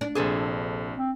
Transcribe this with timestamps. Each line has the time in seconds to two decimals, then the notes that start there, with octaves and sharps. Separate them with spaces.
0.01 D4
0.15 A#1 C3 G#4 A4 C5
0.97 C4